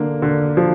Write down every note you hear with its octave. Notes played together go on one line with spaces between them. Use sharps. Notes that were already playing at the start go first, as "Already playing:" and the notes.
Already playing: D3 A#3
D3
F3